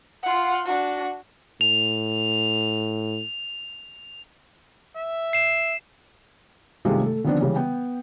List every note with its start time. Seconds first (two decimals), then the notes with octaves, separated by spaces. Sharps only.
0.23 F4 F#5
0.65 D4 F#4
1.61 A2 F7
4.96 E5
5.33 C7 E7
6.85 G2 C3 D#3 G#3 A3 F4
7.01 A3 A4
7.24 D3 D#3 F3 B3 C4 D4
7.40 C#3 E3 G3 G#3 C#4
7.56 B3 G5